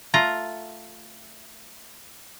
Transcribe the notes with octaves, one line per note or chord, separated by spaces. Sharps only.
A3 F4 A#5